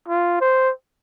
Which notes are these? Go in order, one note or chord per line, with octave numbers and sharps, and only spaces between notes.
F4
C5